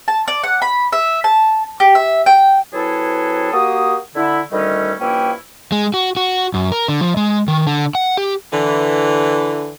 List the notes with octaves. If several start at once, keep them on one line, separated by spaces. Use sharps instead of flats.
A5
D5
F#5
B5
E5
A5
G4
E5
G5
F#3 C4 E4 G#4 A4 B4
A#3 F#4 G4 D#6
D3 E4
D2 D#3 G3 A3 C#4 D#5
G2 F3 A#3 C#4 E4 G5
G#3
F#4
F#4
F#2
A#4
D3
F3
G#3
D#3
D3
F#5
G4
D3 E3